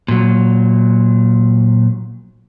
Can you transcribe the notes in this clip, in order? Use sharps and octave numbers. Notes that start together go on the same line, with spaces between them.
A#2 F#3